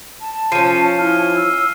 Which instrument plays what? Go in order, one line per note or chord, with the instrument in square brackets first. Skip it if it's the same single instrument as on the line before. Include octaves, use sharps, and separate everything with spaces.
[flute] A5
[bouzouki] F3 C#4 [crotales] C7 D#7
[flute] E4 [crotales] F6
[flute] E6